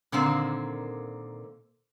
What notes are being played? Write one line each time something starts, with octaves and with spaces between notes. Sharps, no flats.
A#2 D3 D#3 A#3 C4